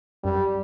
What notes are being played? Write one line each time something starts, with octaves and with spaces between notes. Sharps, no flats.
F#2 G3